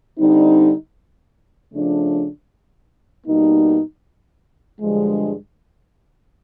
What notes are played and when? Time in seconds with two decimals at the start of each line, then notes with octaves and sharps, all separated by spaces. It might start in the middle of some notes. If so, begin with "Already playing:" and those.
0.19 D3 G3 C4 D#4
1.72 C#3 F3 A3 D4
3.26 B2 G3 A#3 D#4
4.80 G2 D3 F3 G#3